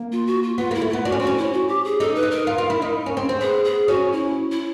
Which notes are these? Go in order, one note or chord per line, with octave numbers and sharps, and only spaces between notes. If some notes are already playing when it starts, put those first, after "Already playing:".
Already playing: A#3
F4
F#4
F4
B3 F4
A#3 E4
A3
B3 F4
D4 F#4
C#4
C4 F#4
C#4
E4
F#4
G4
G#4
D#4 A4
B4
D#4
A#4
F4
F4
E4
D#4
C#4
C4
C4
B3 G#4
G#4
C#4 F#4
E4
E4